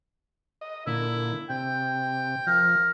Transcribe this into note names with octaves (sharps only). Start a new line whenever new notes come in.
D#5
A#2 D3 E4
C3 G5
F3 A#4